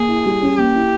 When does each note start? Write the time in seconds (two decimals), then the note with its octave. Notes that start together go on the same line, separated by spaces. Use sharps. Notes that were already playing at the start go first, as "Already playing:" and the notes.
Already playing: A#3 G#4
0.09 E4
0.26 G3
0.42 C#4
0.57 A#3 G4
0.75 E4